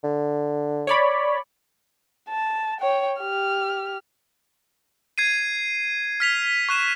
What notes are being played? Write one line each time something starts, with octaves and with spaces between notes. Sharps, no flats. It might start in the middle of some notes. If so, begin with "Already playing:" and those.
D3
C#5 D5 B5
A5
C#5 G5
G4 F6
G#6 C7 D#7
F6 B6 F7
C#6 F#6 E7